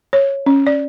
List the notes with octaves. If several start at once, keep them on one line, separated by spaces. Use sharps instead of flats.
C#5
C#4
D5